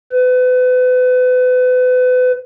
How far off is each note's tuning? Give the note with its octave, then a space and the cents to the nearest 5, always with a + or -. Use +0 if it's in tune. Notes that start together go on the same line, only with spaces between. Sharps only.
B4 +35